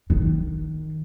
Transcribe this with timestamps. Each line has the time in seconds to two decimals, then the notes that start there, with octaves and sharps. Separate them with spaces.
0.10 D#3